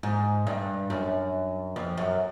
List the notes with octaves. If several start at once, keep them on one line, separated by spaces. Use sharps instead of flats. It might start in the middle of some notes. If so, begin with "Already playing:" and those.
G#2
G2
F#2
F2
F#2